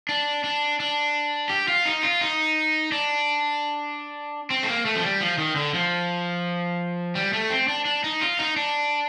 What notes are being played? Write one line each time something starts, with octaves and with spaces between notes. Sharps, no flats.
D4
D4
D4
G4
F4
D#4
F4
D#4
D4
C4
A3
A#3
A3
F3
G3
F3
D#3
D3
F3
G3
A3
C4
D4
D4
D#4
F4
D#4
D4